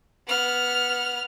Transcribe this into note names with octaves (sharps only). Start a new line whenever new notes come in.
B3 F6